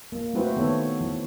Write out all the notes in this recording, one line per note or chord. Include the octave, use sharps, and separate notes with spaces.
A#3
A3 C4 E4 F#4 B4 C5
D#3 B3 A4 C#5
E3